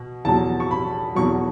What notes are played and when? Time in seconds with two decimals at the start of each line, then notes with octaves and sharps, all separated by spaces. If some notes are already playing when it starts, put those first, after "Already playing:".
Already playing: B2
0.25 E2 B2 F#3 A5
0.60 C#6
0.71 B5
1.15 E2 B2 F#3 C#6